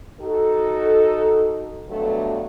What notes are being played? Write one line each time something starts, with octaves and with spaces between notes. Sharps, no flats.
D#4 F#4 A4
G2 B2 D3 F#3 A3